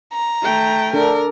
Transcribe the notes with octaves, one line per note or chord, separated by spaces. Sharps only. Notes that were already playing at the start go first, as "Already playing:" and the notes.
A#5
A3 G5
D4 A4 A#4